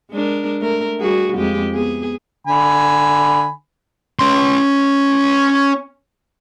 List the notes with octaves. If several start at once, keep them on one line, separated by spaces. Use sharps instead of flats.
G#3 D4 A#4
A3 A#4
G3 F#4 G#4
F2 G#3 G4
B3 G#4
D3 G#5 B5
C#4 C6